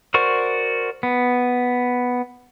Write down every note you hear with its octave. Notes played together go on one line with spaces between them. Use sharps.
F#4 A#4 C5 D5 C#6
B3